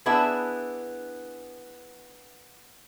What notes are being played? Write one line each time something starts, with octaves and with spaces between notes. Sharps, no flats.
B3 D4 E4 G#4 E5